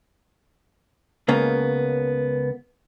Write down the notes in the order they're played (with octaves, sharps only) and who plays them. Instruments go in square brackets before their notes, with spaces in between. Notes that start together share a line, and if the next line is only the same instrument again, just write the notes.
[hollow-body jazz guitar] C#2 C#3 A#3 B3